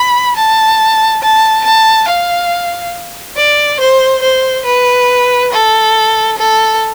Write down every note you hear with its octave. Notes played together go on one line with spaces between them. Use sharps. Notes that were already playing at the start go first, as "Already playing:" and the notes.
Already playing: B5
A5
A5
A5
F5
D5
C5
C5
B4
A4
A4